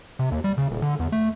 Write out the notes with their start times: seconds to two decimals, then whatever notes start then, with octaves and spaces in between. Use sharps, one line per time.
0.19 C3
0.31 D#2
0.44 G3
0.58 C#3
0.71 D#1
0.82 D3
1.00 E2
1.12 A3